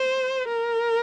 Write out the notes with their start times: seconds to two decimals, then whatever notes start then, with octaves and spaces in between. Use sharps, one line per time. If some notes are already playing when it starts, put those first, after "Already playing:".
Already playing: C5
0.48 A#4